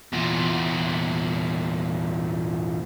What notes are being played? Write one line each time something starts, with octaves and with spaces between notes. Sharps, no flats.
E2 A#2